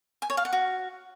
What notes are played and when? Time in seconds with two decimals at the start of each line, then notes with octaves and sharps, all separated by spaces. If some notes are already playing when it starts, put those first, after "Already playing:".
0.22 G#5
0.30 C#5
0.37 F5
0.45 F#5
0.53 F#4